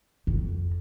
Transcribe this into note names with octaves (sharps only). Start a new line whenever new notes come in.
F2